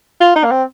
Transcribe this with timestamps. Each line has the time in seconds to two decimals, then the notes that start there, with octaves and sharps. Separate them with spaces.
0.20 F4
0.36 D#4
0.44 A#3
0.51 C4